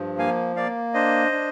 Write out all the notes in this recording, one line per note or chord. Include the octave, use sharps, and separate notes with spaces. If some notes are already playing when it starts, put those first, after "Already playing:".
Already playing: G2 F3
A#3 F5 G#5
A#3 D5 F5
D4 C5 D#5
D4